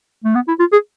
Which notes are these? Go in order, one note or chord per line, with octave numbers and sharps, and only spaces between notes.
A3
B3
E4
F4
G#4